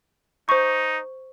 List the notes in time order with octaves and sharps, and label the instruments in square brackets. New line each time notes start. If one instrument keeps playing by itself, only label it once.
[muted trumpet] D#4 [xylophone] C5 C#6